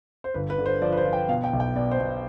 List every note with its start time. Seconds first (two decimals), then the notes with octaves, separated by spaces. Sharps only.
0.24 C5
0.34 G1 B4
0.50 B4
0.58 D3
0.66 C5
0.82 F3 D5
0.92 B4
0.97 C5
1.05 F3
1.13 G5
1.28 B2 F5
1.44 G5
1.53 B1
1.60 G5
1.75 B2 D5
1.91 C5
2.00 B2